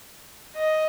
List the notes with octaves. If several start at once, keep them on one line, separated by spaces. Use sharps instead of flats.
D#5